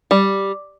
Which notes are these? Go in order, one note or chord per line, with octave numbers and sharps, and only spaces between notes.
G3